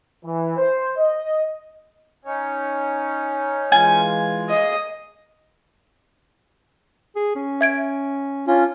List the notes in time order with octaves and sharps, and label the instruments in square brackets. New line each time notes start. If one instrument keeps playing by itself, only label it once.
[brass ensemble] E3
C5
D#5
[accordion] C#4 D#4 C#5
[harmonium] E3 G#3 F4 [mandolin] G#5
[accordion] A#3 G#4 [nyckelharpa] D#5
[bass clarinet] G#4
C#4
[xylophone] E5 G#6 D7
[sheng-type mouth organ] C#4 F4 [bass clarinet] D4